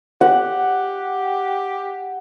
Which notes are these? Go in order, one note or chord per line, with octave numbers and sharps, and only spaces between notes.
G4 F#5